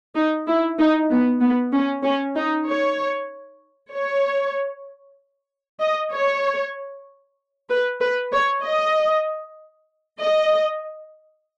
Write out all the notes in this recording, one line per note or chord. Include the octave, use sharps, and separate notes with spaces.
D#4
E4
D#4
B3
B3
C#4
C#4
D#4
C#5
C#5
D#5
C#5
B4
B4
C#5
D#5
D#5